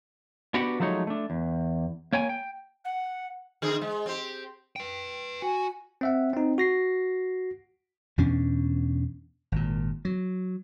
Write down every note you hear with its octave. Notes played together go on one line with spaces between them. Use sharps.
B3 D4 F#4 G4 B4 F#5
F3 F#3 G#3 A3 D#4 C#5
A3 D4
E2
A#3 C#5 G5 G#5
G5
F#5
D3 C4 G#4
G#3
C4 G4
B4 G5
F#4 G#5
C4 E5 F#5
C4 D#4
F#4 A#6 C7
E2 B2 C#4 D4
G#1 A#2
F#3